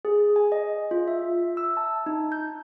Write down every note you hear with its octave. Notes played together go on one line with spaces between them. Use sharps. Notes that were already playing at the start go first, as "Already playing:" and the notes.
G#4
G#5
D#5
F4
E5
E6
A5
D#4
G6